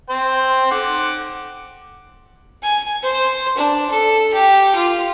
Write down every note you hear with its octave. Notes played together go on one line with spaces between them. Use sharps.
C5 G5
F#5 D6
G#5
C5
D4
A4
G4
F4